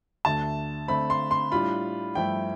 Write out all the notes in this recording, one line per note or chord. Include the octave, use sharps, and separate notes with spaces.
D2 D3 A3 A5
D3 A3 C4 B5
C6
C6
A2 G3 D4 F4 B5
G2 F3 A3 E4 G5